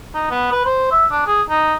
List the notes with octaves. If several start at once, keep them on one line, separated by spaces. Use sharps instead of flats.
D#4
B3
B4
C5
E5
D4
G#4
D#4